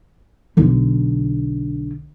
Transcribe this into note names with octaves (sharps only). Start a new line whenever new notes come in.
B1 D3